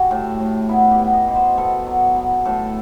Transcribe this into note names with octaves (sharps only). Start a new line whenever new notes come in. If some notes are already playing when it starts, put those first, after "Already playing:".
Already playing: G3 F#4
A2
A2
B3 E4
G4
B3
D#5
B2
C5
B3 A4
F#3
B3
A2 A4